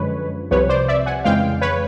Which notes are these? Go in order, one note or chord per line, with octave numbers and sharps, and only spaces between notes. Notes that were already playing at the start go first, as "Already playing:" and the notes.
Already playing: F#2 D3 F3 G#3 B4 C#5
C2 C3 F3 B4 C#5
C5 D5
D5 E5
F#5 G#5
F2 C#3 E3 G#3 F5 G5
B4 C#5